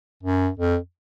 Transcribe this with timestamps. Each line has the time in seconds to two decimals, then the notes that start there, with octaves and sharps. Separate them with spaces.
0.23 F#2
0.59 F2